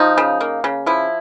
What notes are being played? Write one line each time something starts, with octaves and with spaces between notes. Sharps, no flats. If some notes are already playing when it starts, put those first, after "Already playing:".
Already playing: F3 D#4
C#3
A#3
C#3
F3 E4